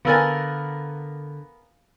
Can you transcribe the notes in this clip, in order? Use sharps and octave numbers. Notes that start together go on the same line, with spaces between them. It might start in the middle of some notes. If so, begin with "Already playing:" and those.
D3 B3 A#4 F5 G#5 E6 A6